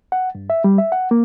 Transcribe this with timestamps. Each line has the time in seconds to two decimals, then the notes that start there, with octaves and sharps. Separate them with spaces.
0.12 F#5
0.35 G2
0.50 E5
0.64 G3
0.78 E5
0.92 F#5
1.11 A#3